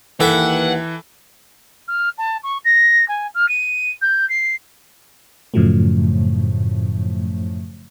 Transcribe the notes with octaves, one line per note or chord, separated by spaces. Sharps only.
D#2 E3 A#3 A4 B4 E5 F#5 G5
F6
A5
C#6
A#6
G#5
F6
D#7
G6
C7
F#2 A2 C#3 F3 F#3 A3